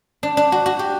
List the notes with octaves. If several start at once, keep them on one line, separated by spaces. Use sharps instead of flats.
D4
D4
F#4
F#4
G4